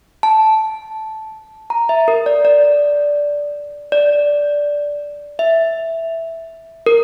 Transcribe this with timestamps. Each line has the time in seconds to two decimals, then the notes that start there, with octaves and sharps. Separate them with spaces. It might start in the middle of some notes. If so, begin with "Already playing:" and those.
0.23 A5
1.70 A#5
1.89 E5
2.08 A#4
2.26 D5
2.45 D5
3.92 D5
5.39 E5
6.86 A#4